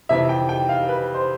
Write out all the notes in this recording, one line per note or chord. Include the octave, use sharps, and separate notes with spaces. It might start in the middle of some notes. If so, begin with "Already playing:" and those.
F2 C3 E3 E5
G5
G5
F5
B4
C5